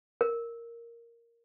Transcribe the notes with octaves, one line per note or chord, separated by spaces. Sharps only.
A#4